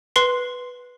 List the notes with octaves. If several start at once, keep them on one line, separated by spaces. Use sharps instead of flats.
B4 C6 C7